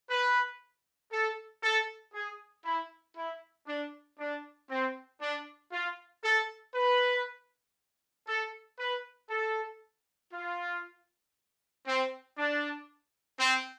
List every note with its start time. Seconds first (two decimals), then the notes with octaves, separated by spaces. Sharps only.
0.10 B4
1.12 A4
1.63 A4
2.14 G#4
2.65 E4
3.17 E4
3.67 D4
4.19 D4
4.70 C4
5.21 D4
5.72 F4
6.24 A4
6.75 B4
8.28 A4
8.79 B4
9.30 A4
10.33 F4
11.87 C4
12.38 D4
13.40 C4